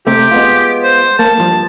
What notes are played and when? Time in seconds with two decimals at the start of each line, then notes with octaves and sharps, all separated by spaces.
0.07 C3 A3 G4
0.31 G#3 B3 F4
0.84 C5
1.19 A#3 A5
1.38 G2 F3